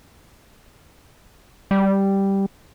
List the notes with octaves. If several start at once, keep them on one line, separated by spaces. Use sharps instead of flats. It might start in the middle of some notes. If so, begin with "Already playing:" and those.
G3